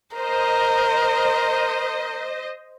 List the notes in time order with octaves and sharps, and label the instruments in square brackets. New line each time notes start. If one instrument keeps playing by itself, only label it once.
[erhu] A#4 [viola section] C5 D#5